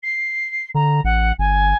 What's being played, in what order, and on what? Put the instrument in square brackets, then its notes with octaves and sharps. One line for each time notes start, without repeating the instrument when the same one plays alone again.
[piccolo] C7
[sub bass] D3 [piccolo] A#5
[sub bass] A1 [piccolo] F#5
[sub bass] G1 [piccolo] G#5